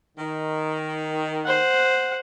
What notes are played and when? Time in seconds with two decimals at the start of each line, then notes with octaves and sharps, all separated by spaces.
0.18 D#3
1.45 C5 F#5